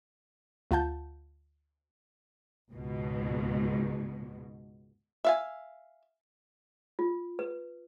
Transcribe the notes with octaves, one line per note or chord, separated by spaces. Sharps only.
D2 F4 F#5 A5 G6
C#2 G#2 B2
E5 F5 G#5
F4
B4